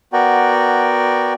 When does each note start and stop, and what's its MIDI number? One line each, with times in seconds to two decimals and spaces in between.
0.13 1.34 59
0.13 1.34 66
0.13 1.34 70
0.13 1.34 74
0.13 1.34 79